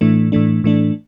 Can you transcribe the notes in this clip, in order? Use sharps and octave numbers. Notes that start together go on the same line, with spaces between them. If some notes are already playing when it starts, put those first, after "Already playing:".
A2 E3 A3 D4
A2 E3 A3 D4
A2 E3 A3 D4